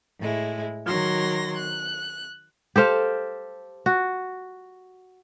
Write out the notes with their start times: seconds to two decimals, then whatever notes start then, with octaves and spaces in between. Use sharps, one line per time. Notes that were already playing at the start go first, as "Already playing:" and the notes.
0.20 A2 G#3 E4
0.86 D#3 F#3 C6 A#6
1.58 F#6
2.76 G4 A4 C5 F5
3.86 F#4